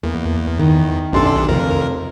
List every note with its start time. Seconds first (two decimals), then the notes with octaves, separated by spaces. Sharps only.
0.03 E2 A#3
0.59 D#3
1.13 B1 F#2 D4 G4 A4 C6
1.49 F1 F2 F3 A#4